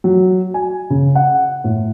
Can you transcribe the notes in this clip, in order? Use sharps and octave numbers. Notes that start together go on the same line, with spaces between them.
F#3
G#5
C#3
F#5
A2